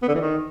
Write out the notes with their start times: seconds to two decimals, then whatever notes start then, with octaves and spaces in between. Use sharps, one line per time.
0.02 B3
0.08 D3
0.15 E3
0.21 D#3